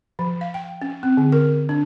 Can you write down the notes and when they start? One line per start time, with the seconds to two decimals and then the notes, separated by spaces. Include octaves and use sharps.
0.19 F3
0.41 F5
0.54 G5
0.82 C#4
1.03 C4
1.17 D3
1.32 A#4
1.69 D4